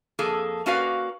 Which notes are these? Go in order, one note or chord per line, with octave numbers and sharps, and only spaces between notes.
F2 A#3 G#4 A4
A#3 C#4 F#4 B4 D5 F5